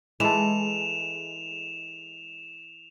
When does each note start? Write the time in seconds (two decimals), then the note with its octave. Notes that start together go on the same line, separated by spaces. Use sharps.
0.20 E3 G#3 A4 E7 F7